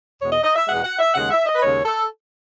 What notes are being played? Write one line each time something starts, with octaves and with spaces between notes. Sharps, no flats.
E2 B2 G#3 C#5
D#5
D#5
E5
E2 B2 G#3 F#5
F#5
E5
D#2 C#3 G#3 F#5
E5
D#5
B4
D#2 C#3 G#3 C#5
A4